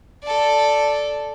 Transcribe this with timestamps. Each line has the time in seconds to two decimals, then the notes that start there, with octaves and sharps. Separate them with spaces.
0.23 A4 D5